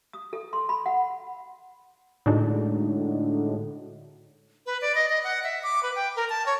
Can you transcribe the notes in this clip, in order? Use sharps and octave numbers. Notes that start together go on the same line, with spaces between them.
D#6
A4
C6
B5
F#5
A2 D3 G#3 D4 D#4 F#4
B4
D5
D#5
D#5
F#5
E5
D6
B4
G5
A#4
A5
C#5